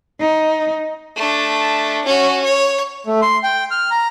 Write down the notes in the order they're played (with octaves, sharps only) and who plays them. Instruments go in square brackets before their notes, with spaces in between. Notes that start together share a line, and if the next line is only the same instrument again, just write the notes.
[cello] D#4
[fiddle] A3 D4
C#4 F#4
C#5
[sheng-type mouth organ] A3
C6
G5
F6
A#5